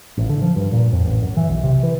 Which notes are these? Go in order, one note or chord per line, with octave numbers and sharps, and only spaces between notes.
A1
D3
F3
G2
A#2
F2
A1
F#2
E3
B1
C3
E3